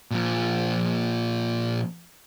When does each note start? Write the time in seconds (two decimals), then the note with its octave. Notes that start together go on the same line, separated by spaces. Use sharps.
0.11 A#2 F3